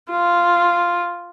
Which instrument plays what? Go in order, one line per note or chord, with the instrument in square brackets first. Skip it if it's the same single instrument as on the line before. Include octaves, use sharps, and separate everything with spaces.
[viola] F4